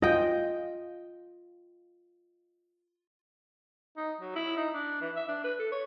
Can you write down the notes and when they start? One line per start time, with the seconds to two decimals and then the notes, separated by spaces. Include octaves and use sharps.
0.02 F4 D#5 G5
3.97 D#4
4.21 F#3
4.36 E4
4.57 D#4
4.74 D4
5.01 E3
5.16 E5
5.29 D4
5.44 B4
5.59 A4
5.72 C#5